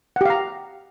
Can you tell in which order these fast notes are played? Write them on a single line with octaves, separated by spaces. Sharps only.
F#5 G4 F5 A#5